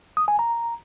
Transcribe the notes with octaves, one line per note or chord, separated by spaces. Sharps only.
D#6
G#5
A#5